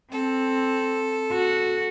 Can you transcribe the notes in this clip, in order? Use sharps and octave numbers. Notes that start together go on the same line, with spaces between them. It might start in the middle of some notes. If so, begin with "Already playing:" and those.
C4 A4
F#4